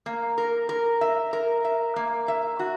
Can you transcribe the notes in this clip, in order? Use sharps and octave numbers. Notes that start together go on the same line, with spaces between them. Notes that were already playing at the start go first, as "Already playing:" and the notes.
A#3
A#4
A#4
E5
A#4
E5
A#3
E5
F#4